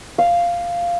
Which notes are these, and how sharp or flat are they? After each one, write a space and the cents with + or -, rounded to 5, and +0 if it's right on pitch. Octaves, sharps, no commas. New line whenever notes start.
F5 -5